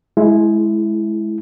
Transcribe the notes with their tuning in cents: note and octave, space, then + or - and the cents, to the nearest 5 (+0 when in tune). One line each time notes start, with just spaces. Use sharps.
G#3 +20 E4 +0